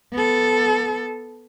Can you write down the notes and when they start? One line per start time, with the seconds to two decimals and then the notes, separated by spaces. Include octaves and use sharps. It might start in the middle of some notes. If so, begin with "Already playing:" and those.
0.13 B3 A4